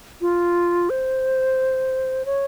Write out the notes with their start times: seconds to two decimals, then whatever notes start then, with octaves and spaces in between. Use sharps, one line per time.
0.21 F4
0.90 C5
2.25 C#5